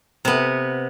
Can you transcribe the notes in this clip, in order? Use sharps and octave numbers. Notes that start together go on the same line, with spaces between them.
C3 B3